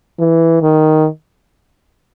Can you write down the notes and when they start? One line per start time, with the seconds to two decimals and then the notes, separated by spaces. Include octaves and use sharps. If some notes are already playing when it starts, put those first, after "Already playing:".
0.19 E3
0.62 D#3